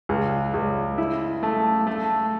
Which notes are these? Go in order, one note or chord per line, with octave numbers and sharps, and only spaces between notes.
C#2
C#2
E4
A3
A3